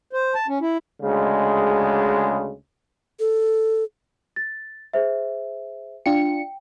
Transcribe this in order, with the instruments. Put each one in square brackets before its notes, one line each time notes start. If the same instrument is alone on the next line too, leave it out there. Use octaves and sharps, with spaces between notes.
[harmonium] C5
A5
C#4
E4
[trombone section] D2 C#3 G#3
[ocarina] A4
[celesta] A6
G#4 C5 E5
[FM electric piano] D4 F4 C#7 [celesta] G5